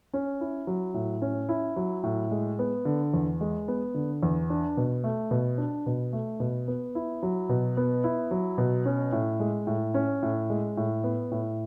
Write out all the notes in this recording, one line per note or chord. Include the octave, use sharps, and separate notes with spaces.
C#4
E4
F#3
A2
C#4
E4
F#3
A2
G#3
B3
D3
E2
G#3
B3
D3
E2
D4
B2
A3
B2
D4
B2
A3
B2
B3
E4
F#3
B2
B3
E4
F#3
B2
C#4
A2
G#3
A2
C#4
A2
G#3
A2
B3
A2